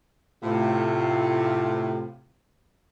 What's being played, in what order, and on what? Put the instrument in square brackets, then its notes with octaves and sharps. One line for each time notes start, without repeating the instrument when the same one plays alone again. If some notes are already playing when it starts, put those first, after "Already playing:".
[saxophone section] A2 [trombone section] C3 F4